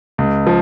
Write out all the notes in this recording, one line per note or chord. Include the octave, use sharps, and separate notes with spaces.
C#2
F3